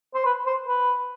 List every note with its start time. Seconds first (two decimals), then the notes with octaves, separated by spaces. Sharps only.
0.14 C5
0.25 B4
0.46 C5
0.68 B4